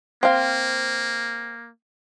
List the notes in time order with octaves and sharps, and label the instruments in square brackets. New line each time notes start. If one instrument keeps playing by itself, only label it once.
[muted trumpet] A#3 [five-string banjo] C4 F5